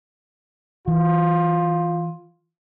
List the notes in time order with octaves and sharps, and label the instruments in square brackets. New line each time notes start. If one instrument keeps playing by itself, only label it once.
[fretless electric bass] E3 [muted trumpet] F4